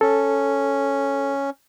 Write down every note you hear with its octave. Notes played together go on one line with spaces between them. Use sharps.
C#4 A4